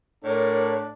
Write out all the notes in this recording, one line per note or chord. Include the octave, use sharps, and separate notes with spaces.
A2 D4 A#4 C#5 D5